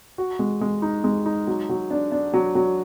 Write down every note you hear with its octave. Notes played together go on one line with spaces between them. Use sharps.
F#4
G#3
G#3
D#4
G#3
D#4
F#3
F#3
D4
D4
F#3
F#3